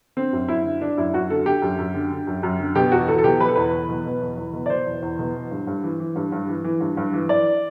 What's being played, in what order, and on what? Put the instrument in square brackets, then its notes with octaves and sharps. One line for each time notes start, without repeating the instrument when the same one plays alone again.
[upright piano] D3 C4
F#2
F#2 E4
D3
D3 D4
F#2 E4
F#2 F#4
D3 A4
D3 G4
F#2
F#2
D3
D3
F#2
F#2
D3
B2 G4
E2 F#4
E2 A4
A4
B2 G4
B2 B4
A4
E2 B4
E2
B2
B2
E2
E2
B2
D5
B2 C5
E2
E2
B2
E3
G2
G2
E3
E3
G2
G2
E3
E3
G2
G2
E3
E3 D5